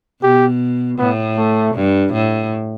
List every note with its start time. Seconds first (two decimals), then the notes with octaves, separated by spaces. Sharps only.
0.22 B2 G4
0.99 A2 B3
1.37 A3
1.75 G2
2.13 A2